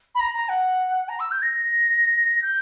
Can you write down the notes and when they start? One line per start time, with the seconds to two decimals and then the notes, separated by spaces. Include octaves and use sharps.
0.15 B5
0.19 A#5
0.34 A#5
0.49 F#5
1.09 A#5
1.19 E6
1.31 G6
1.42 A#6
2.42 G6